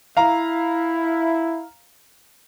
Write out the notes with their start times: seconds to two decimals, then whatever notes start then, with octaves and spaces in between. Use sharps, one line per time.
0.17 E4 F5 A#5